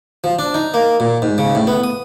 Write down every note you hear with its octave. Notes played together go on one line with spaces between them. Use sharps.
F3
D4
D#4
A#3
A#2
G#2
C#3
A2
B3
D#6